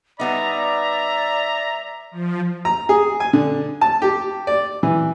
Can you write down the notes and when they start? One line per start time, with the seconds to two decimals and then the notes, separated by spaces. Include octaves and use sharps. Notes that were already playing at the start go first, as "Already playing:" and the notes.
0.19 G3 B3 D#4 D5 E5 A#5
2.11 F3
2.65 A#5
2.89 G#4
3.20 G#5
3.33 D3
3.81 A5
4.02 G4
4.47 D5
4.83 E3